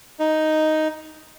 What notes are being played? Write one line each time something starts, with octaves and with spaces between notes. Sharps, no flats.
D#4